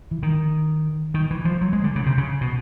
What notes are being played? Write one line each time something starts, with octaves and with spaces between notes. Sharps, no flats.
E3
D#3
D#3
E3
F3
F#3
G#3
D3
C#3
C3
C#3
B2